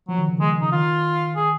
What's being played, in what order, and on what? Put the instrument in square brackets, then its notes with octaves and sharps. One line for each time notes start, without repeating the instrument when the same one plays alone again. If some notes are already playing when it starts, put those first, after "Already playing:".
[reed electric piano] F3 [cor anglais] F#3
[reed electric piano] D#3
C#3
[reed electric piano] D#3 [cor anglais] G#3
[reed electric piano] C#3 [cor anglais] D#4
[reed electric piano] D#3 [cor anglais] F4
[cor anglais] G#4